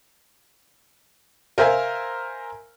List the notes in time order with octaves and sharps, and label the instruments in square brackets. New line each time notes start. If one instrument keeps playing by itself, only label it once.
[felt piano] A#4 C5 E5 F5 G#5